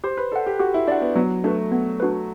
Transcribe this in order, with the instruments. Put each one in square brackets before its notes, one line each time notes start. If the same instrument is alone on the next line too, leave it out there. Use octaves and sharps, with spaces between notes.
[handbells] G4 [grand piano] C5
[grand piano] B4
[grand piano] A4 [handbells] D5 F#5
[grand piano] G4
[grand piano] F#4 [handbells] G4
[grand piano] E4
[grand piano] D4 [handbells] D5 F#5
[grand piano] B3
[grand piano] F#3 [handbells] B3
[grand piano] A3 [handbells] D4 F#4 B4
[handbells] B3
D4 F#4 B4